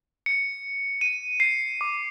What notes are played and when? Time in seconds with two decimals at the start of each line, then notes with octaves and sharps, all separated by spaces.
0.26 C#7
1.01 D#7
1.40 C7
1.81 D6